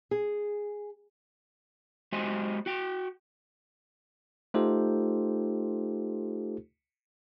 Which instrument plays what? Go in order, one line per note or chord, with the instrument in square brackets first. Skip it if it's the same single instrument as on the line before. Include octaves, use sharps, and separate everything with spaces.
[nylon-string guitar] G#4
[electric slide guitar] G#3 F#4 G4 C5 D#5 G#5
F#4 G5
[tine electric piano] A3 D#4 F4 G4 A4 C5